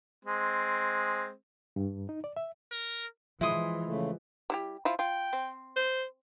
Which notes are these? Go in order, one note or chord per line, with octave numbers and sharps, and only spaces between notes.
G#3 C4
G2
D#4
D5
E5
A#4
E3 F3 G#3 E4 C6 D#6
C#3 A3
G3 E4 G4
F3 E4 F4
F4 G5
C4
C5